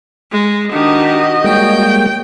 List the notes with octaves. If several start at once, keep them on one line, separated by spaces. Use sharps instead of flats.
G#3
D#3 D4 F#4 G4 D#5 D#6
G3 G#3 A#3 C#5 G5 G6